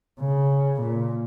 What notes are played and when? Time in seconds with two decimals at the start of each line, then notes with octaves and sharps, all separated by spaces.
0.20 C#3
0.82 A#2